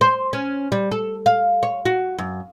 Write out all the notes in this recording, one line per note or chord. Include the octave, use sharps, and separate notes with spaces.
C5
C#4
G3
A4
F5
C#5
F#4
F#2